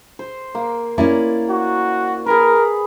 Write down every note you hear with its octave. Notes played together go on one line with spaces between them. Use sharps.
C5
A#3
A#3 C#4 E4 D5 A#5
F#4
G#4 A#4 B4